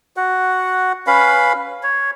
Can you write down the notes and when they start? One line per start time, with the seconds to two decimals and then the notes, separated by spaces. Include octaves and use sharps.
0.17 F#4 F#5
1.07 C#4 B4 F5 B5
1.83 C#5